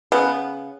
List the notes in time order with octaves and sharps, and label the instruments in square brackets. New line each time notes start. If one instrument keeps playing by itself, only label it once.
[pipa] C#3 B3